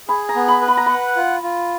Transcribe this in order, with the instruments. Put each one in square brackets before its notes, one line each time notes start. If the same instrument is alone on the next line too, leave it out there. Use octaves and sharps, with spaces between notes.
[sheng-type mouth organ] G#4 [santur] B5
[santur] A#5
[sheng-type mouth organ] B3
[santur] B5
[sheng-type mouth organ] B4
[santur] B5
A#5
[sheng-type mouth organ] F#5 [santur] B5
[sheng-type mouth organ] F4
F4